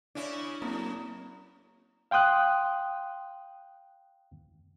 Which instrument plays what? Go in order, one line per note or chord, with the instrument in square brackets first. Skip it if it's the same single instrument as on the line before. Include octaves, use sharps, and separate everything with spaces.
[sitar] C#3 C#4 E4 [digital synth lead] D4
[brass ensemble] F#1 B1 A#5 [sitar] F#2 [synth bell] A#3 C4 E4
[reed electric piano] F5 G5 C6 D#6 F#6